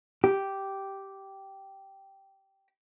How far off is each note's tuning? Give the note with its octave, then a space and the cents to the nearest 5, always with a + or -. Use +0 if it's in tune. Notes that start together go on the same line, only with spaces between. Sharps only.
G4 -10